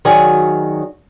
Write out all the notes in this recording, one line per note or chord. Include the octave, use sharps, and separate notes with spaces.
D#3 F#3 F#4 G#4 D5